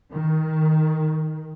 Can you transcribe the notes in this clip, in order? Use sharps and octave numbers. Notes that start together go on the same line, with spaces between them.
D#3